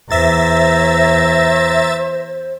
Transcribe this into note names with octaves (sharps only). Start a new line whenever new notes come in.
E2 C5 E5 A#5 A6